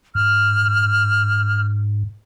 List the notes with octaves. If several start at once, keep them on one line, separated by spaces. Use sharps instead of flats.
G#2 F6